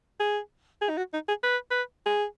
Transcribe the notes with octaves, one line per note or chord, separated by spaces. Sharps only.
G#4
G#4
D#4
F#4
D#4
G#4
B4
B4
G#4